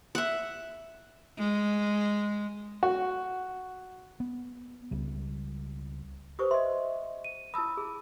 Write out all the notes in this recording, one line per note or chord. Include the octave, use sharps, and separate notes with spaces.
E5 F#5
G#3
F#4
B3
C#2 G3
G4 B4 C5 C#6 D#6
D#5 E5 C6
D#7
E4 A5 B5 D#6 E6
G#4